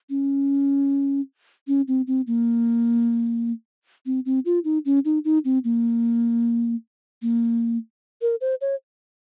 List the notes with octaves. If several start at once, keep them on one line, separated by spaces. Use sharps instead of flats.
C#4
C#4
C4
C4
A#3
C4
C4
F4
D#4
C#4
D#4
D#4
C4
A#3
A#3
A#4
C5
C#5